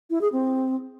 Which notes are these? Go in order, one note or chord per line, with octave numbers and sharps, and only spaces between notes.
E4
G#4
C4